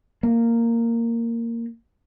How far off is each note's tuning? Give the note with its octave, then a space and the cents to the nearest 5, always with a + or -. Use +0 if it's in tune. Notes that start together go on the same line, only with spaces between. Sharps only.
A#3 -10